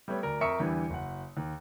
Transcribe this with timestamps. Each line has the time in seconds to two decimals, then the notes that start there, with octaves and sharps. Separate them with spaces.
0.08 G3 A3 B3 C#5
0.22 D2 A#4 D5
0.41 F2 A#4 E5 C#6 D#6 C#7
0.60 E2 D3 E3 G3
0.90 F#1 F#5
1.37 D#2